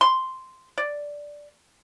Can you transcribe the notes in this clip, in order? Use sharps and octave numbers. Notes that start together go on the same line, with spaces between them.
C6
D5